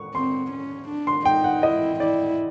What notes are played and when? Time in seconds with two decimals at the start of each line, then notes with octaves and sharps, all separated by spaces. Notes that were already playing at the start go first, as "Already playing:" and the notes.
Already playing: C#6
0.14 C4 C6
0.52 C#4
0.89 D4
1.07 C6
1.25 D#4 G5
1.44 F#5
1.63 E4 D#5
2.00 E4 D5